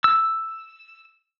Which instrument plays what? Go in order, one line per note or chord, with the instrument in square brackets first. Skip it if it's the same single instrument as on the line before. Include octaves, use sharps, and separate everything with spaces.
[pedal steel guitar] E6